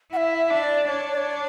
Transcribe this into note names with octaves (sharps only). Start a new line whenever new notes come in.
E4 E5 F#5
E5
D4
D5
D4 C#5
D5
C#5